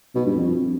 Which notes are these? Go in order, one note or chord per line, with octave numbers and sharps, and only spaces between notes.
B2
G2
F2